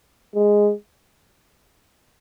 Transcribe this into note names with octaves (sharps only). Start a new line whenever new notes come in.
G#3